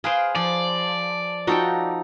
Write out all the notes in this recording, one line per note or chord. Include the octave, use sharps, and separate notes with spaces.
G#4 B4 C5 F5 G5
F3 D5
F3 D#4 F#4 A4 F#5 G5